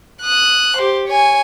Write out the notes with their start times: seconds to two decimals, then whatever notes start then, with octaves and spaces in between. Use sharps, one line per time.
0.22 D#6 F#6
0.77 G4 C5
1.08 C#5 G#5